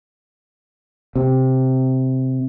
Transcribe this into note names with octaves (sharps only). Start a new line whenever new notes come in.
C3